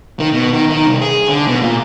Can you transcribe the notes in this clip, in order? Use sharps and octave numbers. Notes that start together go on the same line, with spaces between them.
D#3
B2
D#3
D#3
C2
G#4
D3
B2
A#2